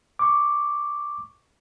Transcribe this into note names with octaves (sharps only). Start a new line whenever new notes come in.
C#6 D6